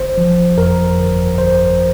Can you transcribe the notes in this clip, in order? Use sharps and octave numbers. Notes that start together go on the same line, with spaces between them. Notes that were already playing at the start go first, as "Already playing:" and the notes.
Already playing: G1 C5
F3
F2 A#4
G1
G1 C5